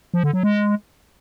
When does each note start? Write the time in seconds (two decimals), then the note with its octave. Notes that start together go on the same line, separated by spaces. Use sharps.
0.14 F3
0.24 D3
0.33 F#3
0.43 G#3